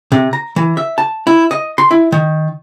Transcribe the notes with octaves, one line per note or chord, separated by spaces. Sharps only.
C3
A#5
E3
E5
A5
E4
D#5
C6
E4
D#3